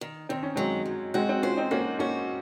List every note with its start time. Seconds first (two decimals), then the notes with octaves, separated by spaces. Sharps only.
0.01 D#3
0.29 D#3 C4
0.43 C#4
0.56 F#3 G#3 C4
0.86 F#3
1.14 G#3 C4 F#4
1.29 C4 D#4
1.42 C#4 F4 C5
1.57 C4 D#4
1.71 A#3 C#4 F#4
1.99 A#3 C#4 F#4